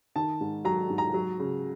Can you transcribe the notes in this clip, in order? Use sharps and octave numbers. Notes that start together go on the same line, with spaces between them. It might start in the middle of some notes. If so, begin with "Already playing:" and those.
D#3 A5
G#2
F#3 A#5
G#2
A#5
F#3
C#3